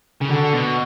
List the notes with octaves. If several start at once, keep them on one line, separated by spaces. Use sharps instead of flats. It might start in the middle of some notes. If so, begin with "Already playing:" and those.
C#3
D3 F#4
B2